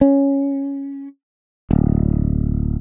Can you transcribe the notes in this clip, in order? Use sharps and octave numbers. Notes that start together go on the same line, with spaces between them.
C#4
D1